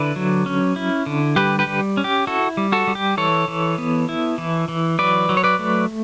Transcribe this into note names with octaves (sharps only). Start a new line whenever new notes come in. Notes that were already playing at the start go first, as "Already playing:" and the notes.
Already playing: D3 E4 B4 D5
F#3
C#4
E4
D3
G3 G4 B4
G4 B4
G3
C#4
G4
E4 F#4 A4
G3
F#4 A4
G3
G4
E3 A4 C#5
E3
B3
E4
E3
E3
F#3 B4 D5
F#3
C#5
B4 D5
A3